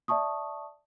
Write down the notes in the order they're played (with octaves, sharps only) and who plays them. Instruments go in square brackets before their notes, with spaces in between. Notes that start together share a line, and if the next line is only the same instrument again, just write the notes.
[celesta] D5 E5 A5 C#6 D#6